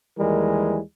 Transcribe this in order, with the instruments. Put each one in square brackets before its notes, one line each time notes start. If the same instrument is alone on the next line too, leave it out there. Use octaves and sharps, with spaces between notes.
[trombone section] D#2 E3 G3 G#3 A#4